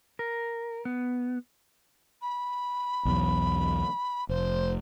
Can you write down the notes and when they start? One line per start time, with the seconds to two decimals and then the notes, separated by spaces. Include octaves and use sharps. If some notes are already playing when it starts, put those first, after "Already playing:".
0.19 A#4
0.85 B3
2.22 B5
3.05 B1 E2 F#3
4.29 F1 C5